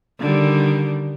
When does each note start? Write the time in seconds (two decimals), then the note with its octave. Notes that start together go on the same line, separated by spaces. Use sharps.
0.19 D3 D#3 G3